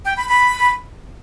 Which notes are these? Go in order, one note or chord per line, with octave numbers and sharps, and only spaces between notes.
G5
B5
B5